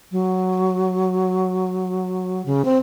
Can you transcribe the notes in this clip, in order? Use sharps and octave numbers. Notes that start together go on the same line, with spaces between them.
F#3
C#3
C4